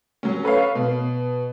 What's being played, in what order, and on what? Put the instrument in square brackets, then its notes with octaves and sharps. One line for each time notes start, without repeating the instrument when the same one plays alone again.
[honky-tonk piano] F#3 C#4
A4 B4 C#5 F5
B2